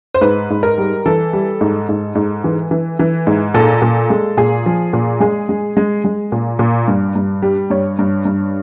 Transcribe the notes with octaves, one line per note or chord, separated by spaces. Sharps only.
C5
G#2 B4
G#2
A#4
G3
E3 A4
G3
G#2
G#2
G#2
E3
E3
E3
G#2
A#2 A4
A#2
G#3
A#2 G#4
F3
A#2
G#3 G#4
G#3
G#3
G#3
A#2
A#2
G2
G2
G3
G2 C#5
G2
G2